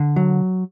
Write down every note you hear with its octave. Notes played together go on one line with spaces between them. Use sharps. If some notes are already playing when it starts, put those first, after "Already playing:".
Already playing: D3
F#3